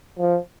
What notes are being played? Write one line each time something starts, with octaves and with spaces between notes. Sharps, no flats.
F3